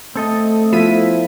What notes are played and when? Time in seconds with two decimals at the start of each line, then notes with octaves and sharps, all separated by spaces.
0.16 A3 C4 A4 D#5
0.73 F3 B3 E4 F4 B6 D#7